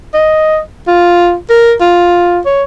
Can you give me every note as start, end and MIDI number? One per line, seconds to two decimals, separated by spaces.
0.14 0.59 75
0.87 1.35 65
1.50 1.74 70
1.81 2.40 65
2.46 2.63 73